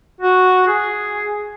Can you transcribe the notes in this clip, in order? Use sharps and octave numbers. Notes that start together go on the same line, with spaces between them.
F#4
G#4